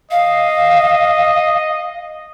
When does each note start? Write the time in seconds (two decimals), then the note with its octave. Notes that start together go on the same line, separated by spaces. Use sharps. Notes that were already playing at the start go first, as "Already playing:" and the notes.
0.11 D#5 F5